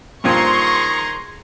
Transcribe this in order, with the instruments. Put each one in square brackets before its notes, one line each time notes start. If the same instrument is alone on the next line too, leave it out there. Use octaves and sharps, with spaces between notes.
[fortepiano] G2 A#2 F3 [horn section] D#3 G#4 A#5 [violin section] C6 C#6